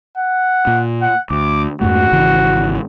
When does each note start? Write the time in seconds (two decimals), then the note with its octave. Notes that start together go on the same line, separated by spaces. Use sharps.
0.17 F#5
0.67 A#2
1.02 F#5
1.30 D2 D6
1.81 F2 G#2 A3 F#4
2.12 G#1 C#3 E3